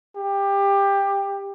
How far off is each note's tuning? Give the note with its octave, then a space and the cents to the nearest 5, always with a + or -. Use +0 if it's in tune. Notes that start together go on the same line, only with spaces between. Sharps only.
G4 +20